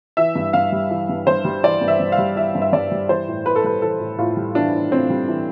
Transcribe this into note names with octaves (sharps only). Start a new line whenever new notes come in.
E3 E5
G2
G2 F5
G3
E3
G2
G2 C5
G3
E3 D5
G2
E5
G2
F5
G3
E3 E5
G2
E5
G2 D5
G3
E3 C5
A2
A2 B4
A4
G3 B4
E3 A4
A2
A2 F4
G3
E3 D4
A2
A2 C4
G3
E3